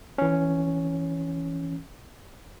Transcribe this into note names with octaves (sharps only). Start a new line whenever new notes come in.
E3 C#4